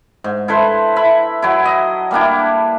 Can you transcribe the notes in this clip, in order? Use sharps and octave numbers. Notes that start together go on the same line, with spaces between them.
G#2
E4 A4 B4 C5
E4 E5 B5
F#3 E4
D#5
G3 A#3 D4 E4